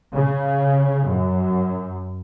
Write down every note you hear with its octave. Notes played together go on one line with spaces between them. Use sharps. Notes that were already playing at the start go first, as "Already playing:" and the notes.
C#3
F#2